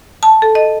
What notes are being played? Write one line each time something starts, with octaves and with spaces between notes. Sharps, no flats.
A5
A4
D#5